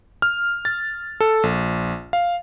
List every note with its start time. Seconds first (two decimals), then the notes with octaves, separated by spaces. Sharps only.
0.22 F6
0.65 A6
1.20 A4
1.43 A#1
2.13 F5